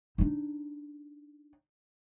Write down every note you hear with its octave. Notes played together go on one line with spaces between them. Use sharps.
D4 D#4